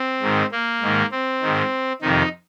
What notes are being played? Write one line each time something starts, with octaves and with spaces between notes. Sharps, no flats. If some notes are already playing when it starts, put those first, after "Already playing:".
Already playing: C4
G#2 D#3
A#3
G#2 D#3
C4
G#2 D#3
F2 C3 D#3 D#4